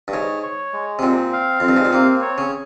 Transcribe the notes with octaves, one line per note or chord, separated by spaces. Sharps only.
G2
G#2 C#5
C#5
G#3
C3
A#2 C4
F5
F2 C4
G2
G#2
A#2
C3 A#3
C#5
C#3